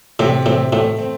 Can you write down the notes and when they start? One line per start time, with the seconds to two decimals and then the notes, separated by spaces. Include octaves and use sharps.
0.19 A2 C3
0.45 A2 C4
0.72 A2 A3
0.99 C4